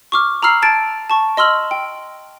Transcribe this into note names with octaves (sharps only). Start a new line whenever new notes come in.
C#6 D6 F6
A#5 B5 E6 F6 C7
A5 G#6 A6 D7
A5 C#6
D#5 C6 E6 F6 F#7
G5